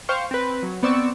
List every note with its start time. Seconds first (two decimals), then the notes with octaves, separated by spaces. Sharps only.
0.09 C5 F5 G5 C#6 F6
0.31 C4 B4
0.63 F#3
0.83 B3 C4 D5 C#6 E6